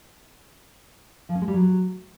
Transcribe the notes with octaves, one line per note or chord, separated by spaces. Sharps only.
F3
C#4
G#3
G3
F#3